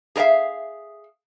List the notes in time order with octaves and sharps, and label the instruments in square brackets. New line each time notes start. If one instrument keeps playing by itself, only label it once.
[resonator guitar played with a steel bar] G#4 A#4 D5 E5 F5